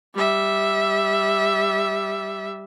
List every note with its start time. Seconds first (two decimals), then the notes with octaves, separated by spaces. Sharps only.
0.15 G3 E5